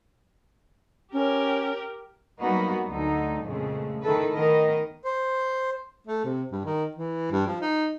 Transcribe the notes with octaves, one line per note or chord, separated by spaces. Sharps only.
C#4 G4 A#4
F#3 G3 A#3 B3 D#4 F#4
D2 D3 D#4
F2 A#2 C#3 G#3 A3
D#3 A3 E4 A4 B4
D#3 B3 A#4 D#5
C5
A3
C3
G2
D#3
E3
G2
F3
D#4